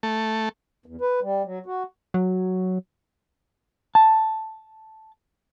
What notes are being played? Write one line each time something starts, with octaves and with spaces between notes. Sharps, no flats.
A3
E2
B4
G3
F#3
F#4
F#3
A5